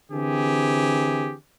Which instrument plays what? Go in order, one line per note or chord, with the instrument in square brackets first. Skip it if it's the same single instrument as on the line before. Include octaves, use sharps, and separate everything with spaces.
[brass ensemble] D3 E3 C4 G4 G#4